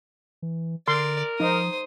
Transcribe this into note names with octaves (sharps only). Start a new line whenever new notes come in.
E3
D3 A#4 D5 C6
F3 D#4 C5 D#6